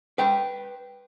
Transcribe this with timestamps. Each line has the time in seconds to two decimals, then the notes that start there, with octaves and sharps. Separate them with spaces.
0.18 B4 G5